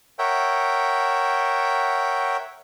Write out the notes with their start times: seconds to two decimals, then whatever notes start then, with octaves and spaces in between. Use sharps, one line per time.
0.19 A#4 C#5 E5 F#5 G5